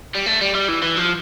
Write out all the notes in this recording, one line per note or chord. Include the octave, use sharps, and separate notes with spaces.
G3
A3
G3
G3
E3
E3
F3